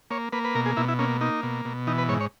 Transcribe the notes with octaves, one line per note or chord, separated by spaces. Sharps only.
A#3 C#5
A#3 B4
B4
B2 A#4
G#4
B2 E4
E4
A#3 C#4
A#3 D#4
B2
B2
E3 D#4
B4
G#2 C#5
C#5